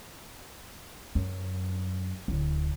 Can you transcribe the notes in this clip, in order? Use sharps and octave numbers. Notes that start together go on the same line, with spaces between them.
F#2
D1